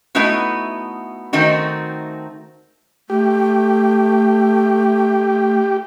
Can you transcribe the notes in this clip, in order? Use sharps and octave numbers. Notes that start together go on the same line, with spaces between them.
A3 B3 D#4 E4 F#4
D#3 A3 C4 D#4 F#4
A3 G4